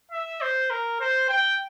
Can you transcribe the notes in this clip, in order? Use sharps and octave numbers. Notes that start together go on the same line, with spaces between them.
E5
C5
A#4
C5
G5